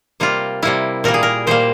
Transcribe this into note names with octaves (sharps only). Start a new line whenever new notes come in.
C3 G3 A#3 F4
C3 G3 A#3 E4
A#2 G3 A#3 A#4
G#4
A#4
A#2 G3 A#3 C5